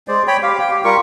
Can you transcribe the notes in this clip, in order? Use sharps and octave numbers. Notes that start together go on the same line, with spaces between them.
G#3 C5 D5
C#5 G5 B5
G4 F5
G5
G4
G3 F4 A#4 C#6